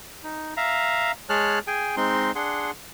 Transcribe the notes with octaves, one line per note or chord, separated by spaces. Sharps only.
D#4
E5 F5 A#5
G#3 G#4 C#5 A5 F6 F#6
G#4 G5 G#5
G#3 C4 D#4 C6
D4 G#4 F#5 C6